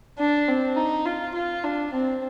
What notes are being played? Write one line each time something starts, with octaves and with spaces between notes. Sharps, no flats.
D4
C4
D#4
F4
F4
D4
C4